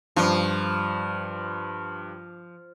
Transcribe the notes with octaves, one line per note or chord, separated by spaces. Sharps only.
G2 F3